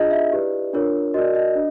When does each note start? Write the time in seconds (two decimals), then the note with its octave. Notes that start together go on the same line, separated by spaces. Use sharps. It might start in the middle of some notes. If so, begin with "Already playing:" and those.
Already playing: D4 F4 G#4 D#5
0.11 E5
0.32 E4 G4 B4 D5
0.73 D4 F4 A#4 C#5
1.14 F#4 A#4 D5 D#5
1.35 D#5
1.55 D4